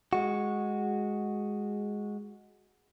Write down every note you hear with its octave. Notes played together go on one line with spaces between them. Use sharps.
G#3 F#4